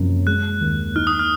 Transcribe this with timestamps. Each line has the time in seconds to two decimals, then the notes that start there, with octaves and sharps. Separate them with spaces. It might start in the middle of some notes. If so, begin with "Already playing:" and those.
Already playing: F#2 C3 F3
0.27 G#3 F#6
0.61 D#2
0.96 D#4 F6
1.07 D#6
1.19 F6